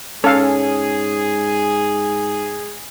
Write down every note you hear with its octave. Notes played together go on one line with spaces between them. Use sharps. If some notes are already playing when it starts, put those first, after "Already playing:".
G#2 C#4 G#4 A4 F5